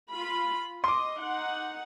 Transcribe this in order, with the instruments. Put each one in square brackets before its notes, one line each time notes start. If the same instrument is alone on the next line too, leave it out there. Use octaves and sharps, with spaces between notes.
[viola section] F4 B5
[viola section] D#5 [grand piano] C6 D6
[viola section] D#4 F#5